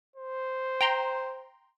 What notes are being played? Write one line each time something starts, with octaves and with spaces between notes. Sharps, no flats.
C5
G5 A#5 C6